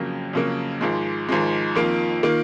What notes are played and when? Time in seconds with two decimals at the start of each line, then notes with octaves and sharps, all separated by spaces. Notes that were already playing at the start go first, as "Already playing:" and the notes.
Already playing: F2 C#3 F#3 A#3
0.33 F2 C#3 F#3 A#3
0.81 G#1 G#2 F3 G#3
1.29 G#1 G#2 F3 G#3
1.76 F2 D#3 A#3 F4
2.23 D#3 A#3 F4